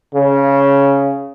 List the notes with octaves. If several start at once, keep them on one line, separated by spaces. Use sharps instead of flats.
C#3